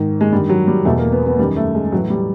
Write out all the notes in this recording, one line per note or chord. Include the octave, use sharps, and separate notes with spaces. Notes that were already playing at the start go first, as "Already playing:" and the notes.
Already playing: G#2 D#3
G#3
G2 D#3 G3
F#3
G3
E2 B2 A3
A#3
B3
B3
F#2 D#3 G3
A3
G#3
A2 E3 F#3
G3